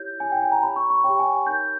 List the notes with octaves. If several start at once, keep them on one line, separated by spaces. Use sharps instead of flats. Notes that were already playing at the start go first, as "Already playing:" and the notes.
Already playing: E4 G4 C#5 G6
E4 G4 C#5 G#5
G5
G#5
A#5
G4 C#5 B5
C#6
C#6
G4 C#5 G5
G#5
D#4 A#4 C#5 G6